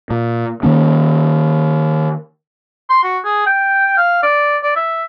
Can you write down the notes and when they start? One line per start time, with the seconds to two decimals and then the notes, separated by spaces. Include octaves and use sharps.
0.10 A#2
0.63 D#3 A#3 C#4
2.90 C6
3.04 F#4
3.25 G#4
3.46 G5
3.97 F5
4.23 D5
4.63 D5
4.76 E5